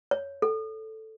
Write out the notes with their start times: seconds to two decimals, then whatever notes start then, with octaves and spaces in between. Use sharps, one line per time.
0.11 C#5
0.42 A4